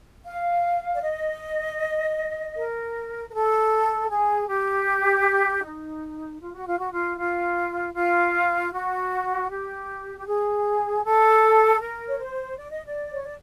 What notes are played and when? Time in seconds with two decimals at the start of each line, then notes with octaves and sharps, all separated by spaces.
0.25 F5
0.94 D5
1.02 D#5
2.56 A#4
3.29 A#4
3.33 A4
4.09 G#4
4.48 G4
5.64 D#4
6.40 F4
6.54 F#4
6.66 F4
6.78 F#4
6.91 F4
7.18 F4
7.95 F4
8.72 F#4
9.49 G4
10.18 G4
10.26 G#4
11.04 A4
11.80 A#4
12.08 C#5
12.19 C5
12.58 D5
12.71 D#5
12.85 D5
13.12 C#5
13.23 D5